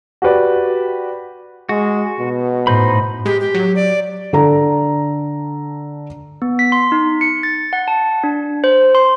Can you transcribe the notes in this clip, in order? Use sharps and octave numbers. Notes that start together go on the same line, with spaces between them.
F#4 G4 B4 D5
G#3 F#4
B2
A2 D#4 C5 B5
G#3 G4
G4
F#3
D5
D3 A4 A#5
B3
B6
C6
D#4
C#7
A6
F#5
A5
D4
C5
C6